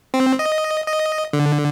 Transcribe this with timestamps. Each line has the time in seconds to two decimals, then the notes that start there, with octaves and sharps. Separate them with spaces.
0.14 C4
0.39 D#5
0.87 D#5
1.33 D3